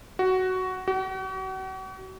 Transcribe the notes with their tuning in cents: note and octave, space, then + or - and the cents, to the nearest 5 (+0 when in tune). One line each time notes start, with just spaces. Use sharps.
F#4 +10
F#4 +40